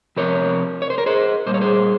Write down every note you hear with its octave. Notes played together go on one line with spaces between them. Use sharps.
C3 F3 A#4 C#5
C#5
C5
A#4
G#4 C5
A#2 G3 A#3 C5
C#5
G#4 C5